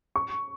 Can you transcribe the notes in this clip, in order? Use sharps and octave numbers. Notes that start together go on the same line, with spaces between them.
C#6